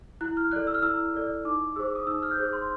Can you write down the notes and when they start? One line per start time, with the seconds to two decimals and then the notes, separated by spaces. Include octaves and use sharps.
0.21 E4 F#6
0.37 F6
0.51 A4 D5 F#6
0.67 E6
0.74 F6
0.83 E4 E6
1.14 A4 D5
1.45 D#4 D6
1.76 G#4 C5 E6
1.95 D#6
2.07 D#4 E6
2.23 F6
2.31 G6
2.37 G#4 C5 F#6
2.53 C6